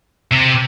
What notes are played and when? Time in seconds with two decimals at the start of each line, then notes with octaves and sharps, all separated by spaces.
0.31 C3